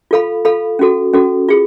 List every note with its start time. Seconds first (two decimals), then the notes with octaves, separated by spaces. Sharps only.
0.11 F4 A4 F5 B5
0.45 F4 A4 F5 B5
0.79 C#4 F#4 A4
1.13 C#4 F#4 A4
1.49 F4 G#4